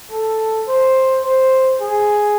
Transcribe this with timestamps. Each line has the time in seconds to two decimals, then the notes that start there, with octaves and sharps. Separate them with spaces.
0.11 A4
0.68 C5
1.24 C5
1.81 G#4